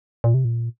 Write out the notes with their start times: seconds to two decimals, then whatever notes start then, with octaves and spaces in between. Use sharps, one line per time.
0.24 A#2
0.34 C3
0.45 A#2